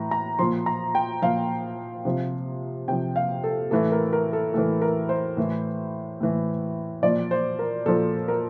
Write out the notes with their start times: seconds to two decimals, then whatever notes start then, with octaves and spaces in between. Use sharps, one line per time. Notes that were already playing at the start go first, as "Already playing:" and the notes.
Already playing: A2 E3 A#5
0.11 A#5
0.39 A#2 F3 C6
0.66 A#5
0.95 G5
1.22 A#2 F3 F5
2.05 C3 F3
2.88 C3 F3 G5
3.16 F5
3.44 A4
3.71 A2 E3 A4
3.92 A#4
4.13 A#4
4.33 A4
4.54 A2 E3 A4
4.82 A#4
5.09 C5
5.37 A2 E3
6.21 A2 E3
7.03 A#2 F3 D5
7.31 C5
7.59 A#4
7.86 A#2 F3 A4
8.28 A#4